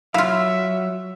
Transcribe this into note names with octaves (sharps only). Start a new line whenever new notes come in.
F#3 E4 F4 E5 F5